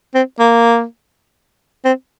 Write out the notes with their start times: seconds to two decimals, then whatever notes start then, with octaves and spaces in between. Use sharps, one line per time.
0.15 C4
0.39 A#3
1.85 C4